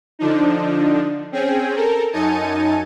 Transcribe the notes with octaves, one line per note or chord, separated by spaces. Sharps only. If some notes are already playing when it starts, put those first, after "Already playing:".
D3 F3 D4 D#4
C4 C#4 G#4 G5
A4 A#4
F#2 D#4 G#5 A5 C#7 D#7